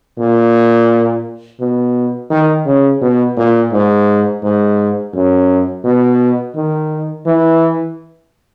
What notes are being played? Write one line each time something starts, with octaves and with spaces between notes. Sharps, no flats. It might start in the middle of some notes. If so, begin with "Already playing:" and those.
A#2
B2
D#3
C#3
B2
A#2
G#2
G#2
F#2
B2
D#3
E3